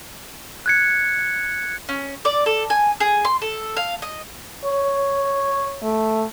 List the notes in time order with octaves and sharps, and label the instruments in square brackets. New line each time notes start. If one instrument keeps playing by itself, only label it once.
[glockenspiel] F#6 G#6 C#7
[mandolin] C#4
D5
A4
G#5
G#4
C6
A4
F5
D#5
[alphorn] C#5
A3